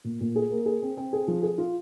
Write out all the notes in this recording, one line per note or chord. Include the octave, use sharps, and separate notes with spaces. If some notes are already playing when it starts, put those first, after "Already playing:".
A#2
A#2
G#4
A#3
G#4
C4
C4
G#4
F3
G#4
F4